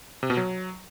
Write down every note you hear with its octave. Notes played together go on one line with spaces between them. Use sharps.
C3
B2
F#3